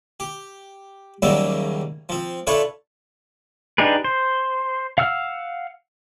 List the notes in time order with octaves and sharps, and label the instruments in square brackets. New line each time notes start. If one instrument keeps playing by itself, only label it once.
[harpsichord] G4
D#2 C#3 F#3 G3 A#3 E5
F3 C4
D4 F4 A4 B4 C#5 E5
[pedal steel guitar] D4 D#4 G4 G#4 B4
C5
F5 F#5 E6 F6